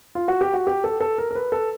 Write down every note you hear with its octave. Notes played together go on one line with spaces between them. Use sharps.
F4
F#4
G4
F#4
G4
A4
A4
A#4
A#4
B4
A4